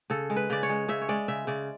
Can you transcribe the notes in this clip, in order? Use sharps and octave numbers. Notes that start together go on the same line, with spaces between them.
C#3 A4
G#3
B4
C#3 D5
C#5
G#3
C#3 E5
C#5
G#3 D5
C#3 E5
C#3 D5